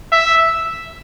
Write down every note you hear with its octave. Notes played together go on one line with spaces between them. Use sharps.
E5